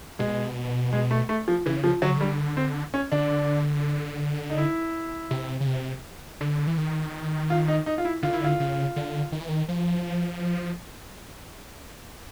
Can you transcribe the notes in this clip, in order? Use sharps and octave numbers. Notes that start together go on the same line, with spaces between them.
B2 G#3
G#3
A3
A3
F3
C#3 E3
F3
D3 F#3
C#3
D3 G3
C4
C#4
D3 D4
D#4
E4
C3
C#3
C3
D3
E3
D#3
F4
D#4
D#4
F4
E4
D3 F4
D#3 E4
D3 F4
C#3
D3
D#3
E3
D#3
F3